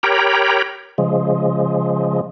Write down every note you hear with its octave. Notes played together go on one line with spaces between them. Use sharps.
G4 A#4 C#5 G5 A#5 B5
C#3 F3 G#3